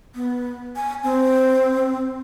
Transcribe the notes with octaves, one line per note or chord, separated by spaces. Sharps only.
B3
G#5
C4